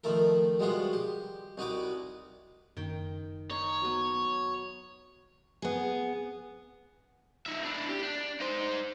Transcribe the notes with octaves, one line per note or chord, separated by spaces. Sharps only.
D#3 F3 A3 A4 A#4
G3 G#3 B3 F4 F#4
G4
C2 D#4 F#4 B4 D6
F#1 D#3 G5
D#4 C#5
F#3 B3
B3 G#4
D#4 E5
D4 E4
G4
D4
D#4 C5